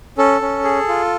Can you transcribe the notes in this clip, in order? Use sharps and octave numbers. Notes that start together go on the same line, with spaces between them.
C#4 A4
C#4
G#4
F4